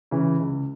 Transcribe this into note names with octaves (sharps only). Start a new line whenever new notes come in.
C#3 E3
C#2